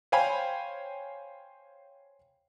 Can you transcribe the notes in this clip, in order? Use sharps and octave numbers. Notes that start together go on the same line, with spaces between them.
C5 C#5 F5 G5 G#5 B5